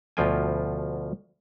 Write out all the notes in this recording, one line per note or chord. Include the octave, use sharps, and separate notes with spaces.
D2 B2 F3 F4 G5 G#5